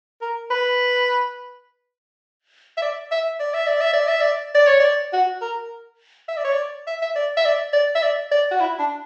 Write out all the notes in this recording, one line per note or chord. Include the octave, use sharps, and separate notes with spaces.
A#4
B4
E5
D5
E5
D5
E5
D5
E5
D5
E5
D5
D5
C#5
D5
F#4
A#4
E5
D5
C#5
D5
E5
E5
D5
E5
D5
D5
E5
D5
D5
F#4
E4
D4